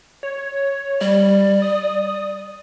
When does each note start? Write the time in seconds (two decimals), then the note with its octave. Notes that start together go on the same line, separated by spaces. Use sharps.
0.23 C#5
1.01 G3 D5
1.62 D#6